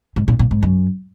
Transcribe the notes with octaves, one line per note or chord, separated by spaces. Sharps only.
G#2
A#2
A#2
G#2
F#2